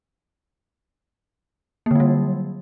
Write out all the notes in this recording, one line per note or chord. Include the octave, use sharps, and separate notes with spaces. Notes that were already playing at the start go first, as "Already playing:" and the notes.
D3 F#3 G3 A#3